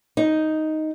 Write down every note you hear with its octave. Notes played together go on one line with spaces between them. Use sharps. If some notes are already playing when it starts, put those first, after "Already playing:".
D#4